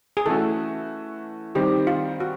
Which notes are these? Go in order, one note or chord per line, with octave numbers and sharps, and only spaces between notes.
G#4
E3 A3 C#4 F#4 A4
D#3 G3 C4 G4
F4
F#4